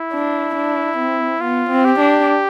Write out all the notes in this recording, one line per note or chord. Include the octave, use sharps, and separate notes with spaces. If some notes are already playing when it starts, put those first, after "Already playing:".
Already playing: E4
D4
D4
C4
B3 F4
C4
G4
D4